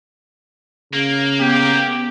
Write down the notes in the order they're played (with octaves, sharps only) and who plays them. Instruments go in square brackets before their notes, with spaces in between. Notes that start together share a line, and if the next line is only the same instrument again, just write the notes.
[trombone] C#3 [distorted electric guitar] A#3
[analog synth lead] B3 [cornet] G4